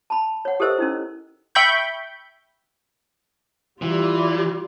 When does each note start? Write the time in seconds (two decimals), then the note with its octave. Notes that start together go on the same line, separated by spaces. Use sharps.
0.10 A5 B5
0.45 C#5 F#5
0.60 G4 A4 A#4 C5 D#5 E6
0.78 C#4 D#4 E4
1.55 E5 G5 B5 C#6 G6
3.82 E3 G3 F4